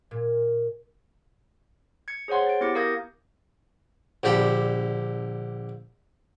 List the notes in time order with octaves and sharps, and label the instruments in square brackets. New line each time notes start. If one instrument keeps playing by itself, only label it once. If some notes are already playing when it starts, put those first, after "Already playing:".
[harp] A#2
[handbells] G#6 C#7
G#4 C5 C#5 F#5 C6
A6 D7
B3 E4 G4 D6 A6 C#7
A#4 F5 D#6 G6 G#6 A#6
[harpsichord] A#1 D3 G4 A4 B5